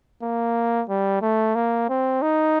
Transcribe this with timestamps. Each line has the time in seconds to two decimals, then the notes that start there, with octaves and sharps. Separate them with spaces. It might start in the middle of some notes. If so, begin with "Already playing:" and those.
0.23 A#3
0.90 G3
1.22 A3
1.55 A#3
1.90 C4
2.22 D#4